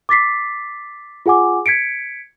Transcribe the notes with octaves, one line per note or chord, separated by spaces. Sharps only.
D6 A6 B6 C7
F4 G#4 F#5 G#5 D6
G#6 B6 C#7 D7